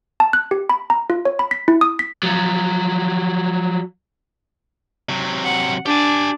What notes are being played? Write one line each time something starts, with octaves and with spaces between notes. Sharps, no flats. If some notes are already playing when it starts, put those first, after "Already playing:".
A5
F#6
G4
B5
A#5
F4
C#5
B5
B6
E4
D#6
B6
F3 F#3
C3 F#3
F#5
D4 G4 G#5